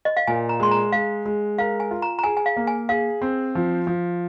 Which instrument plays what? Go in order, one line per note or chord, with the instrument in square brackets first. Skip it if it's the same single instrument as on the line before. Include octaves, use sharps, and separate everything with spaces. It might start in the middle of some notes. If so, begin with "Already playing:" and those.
[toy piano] D#5
F5
[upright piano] A#2 [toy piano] G#5
[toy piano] A#5
[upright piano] G#3 [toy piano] C6
[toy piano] A#5
[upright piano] G#3 [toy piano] F5
[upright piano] G#3
[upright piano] A#4 [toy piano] F5
[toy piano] G#5
[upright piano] F4
[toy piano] A#5
A#5
[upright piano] G#4 [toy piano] G#5
[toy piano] G#5
F5
[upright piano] A#3
[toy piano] G#5
[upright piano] G#4 [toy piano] F5
[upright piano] C4
F3
F3